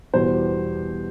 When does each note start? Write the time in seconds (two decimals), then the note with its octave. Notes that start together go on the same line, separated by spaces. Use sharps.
0.13 E2 B2 G3 C5